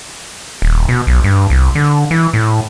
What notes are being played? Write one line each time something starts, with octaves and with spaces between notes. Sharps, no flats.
D#1
B2
B1
G2
C2
D3
E3
A2